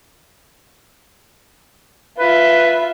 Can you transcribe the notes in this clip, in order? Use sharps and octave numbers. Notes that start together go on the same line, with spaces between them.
F4 B4 E5